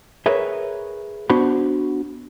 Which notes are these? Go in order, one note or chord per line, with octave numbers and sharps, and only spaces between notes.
G#4 A#4 B4 C#5 E5
B3 D4 F#4 C5 B5